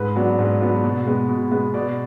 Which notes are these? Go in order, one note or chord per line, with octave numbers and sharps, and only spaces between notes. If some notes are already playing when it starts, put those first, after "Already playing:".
Already playing: G#2 B4
F#3 B3 D4
G#2
F#3 B3 D4
B2
G#3 B3
B2
G#3 B3
B2 D5